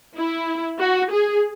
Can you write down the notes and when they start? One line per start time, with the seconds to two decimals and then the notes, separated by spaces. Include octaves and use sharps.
0.17 E4
0.80 F#4
1.12 G#4